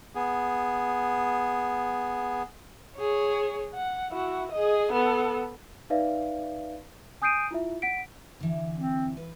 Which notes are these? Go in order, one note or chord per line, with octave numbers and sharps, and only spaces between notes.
B3 G#4
G#4 C#5
F#5
E4 F#4
G#4 D#5
B3 A4
D#4 B4 D5 E5 F5
G#5 D#6 G6 C7 D7 D#7
E4 F4 E5
F#5 B6 D7
D3 E3
C4
B4